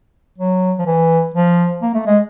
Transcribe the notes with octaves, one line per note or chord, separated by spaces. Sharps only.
F#3
F3
E3
F3
A#3
A3
G#3